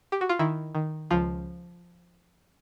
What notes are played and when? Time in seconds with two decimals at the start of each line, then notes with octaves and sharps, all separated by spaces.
0.12 G4
0.21 F#4
0.29 F4
0.39 D#3 E4
0.75 D#3
1.11 C#2 F3 F4